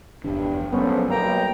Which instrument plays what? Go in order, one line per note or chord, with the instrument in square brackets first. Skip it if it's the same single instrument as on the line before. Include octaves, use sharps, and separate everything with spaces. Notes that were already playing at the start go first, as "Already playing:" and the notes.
[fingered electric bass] F1 E2 D4 [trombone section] G2
[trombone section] A#1 A3 C5 [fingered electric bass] F#3 G3 [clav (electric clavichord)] B3 C#4
[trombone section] B1 [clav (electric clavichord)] A#3 [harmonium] G5 A#5